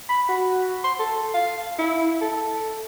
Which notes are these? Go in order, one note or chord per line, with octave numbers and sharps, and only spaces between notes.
B5
F#4
C6
A4
F5
E4
A4